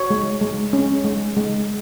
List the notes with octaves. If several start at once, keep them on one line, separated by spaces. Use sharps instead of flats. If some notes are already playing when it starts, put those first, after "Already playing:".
Already playing: F#4 C#5
G#3
G#3
C#4
G#3
G#3